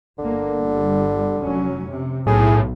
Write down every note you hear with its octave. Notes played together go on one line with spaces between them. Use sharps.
G1 D3 A#3
G1 G3
F1 F#3 C#4
C3
B1 A2 G#4